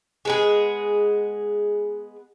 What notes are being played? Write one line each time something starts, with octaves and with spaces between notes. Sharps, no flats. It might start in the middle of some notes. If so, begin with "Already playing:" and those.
G#3 B3 G#4